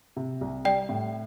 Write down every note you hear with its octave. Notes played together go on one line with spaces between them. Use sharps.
C3
C2
G3 D5 G5
A2